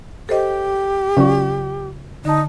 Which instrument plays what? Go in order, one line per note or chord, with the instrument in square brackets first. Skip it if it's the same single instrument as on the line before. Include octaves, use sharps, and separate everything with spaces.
[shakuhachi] G4 [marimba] A4 C5 D#5
[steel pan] C#3 F#3 F4 [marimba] D5 C#6
[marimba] D3 A5 [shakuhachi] D#4